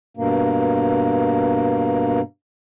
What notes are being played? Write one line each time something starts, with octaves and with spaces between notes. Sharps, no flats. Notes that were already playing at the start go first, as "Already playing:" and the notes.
G2 B2 A#3